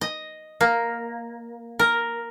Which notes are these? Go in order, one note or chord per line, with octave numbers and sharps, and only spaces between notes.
D#5
A#3
A#4